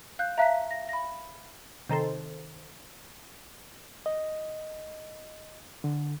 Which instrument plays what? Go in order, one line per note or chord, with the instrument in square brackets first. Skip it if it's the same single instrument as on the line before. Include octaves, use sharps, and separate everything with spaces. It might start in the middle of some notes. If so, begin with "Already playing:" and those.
[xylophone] F5 F#6 G6
[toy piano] E5 F5 A5 [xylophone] A#5 F#6 B6
[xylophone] A#6
B5 A#6
[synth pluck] C3 D#3 A4 C5
[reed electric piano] D#5
D3